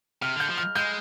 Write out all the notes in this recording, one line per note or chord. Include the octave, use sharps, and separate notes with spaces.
C3 F6
D3 G6
F3
F6
G#3 G6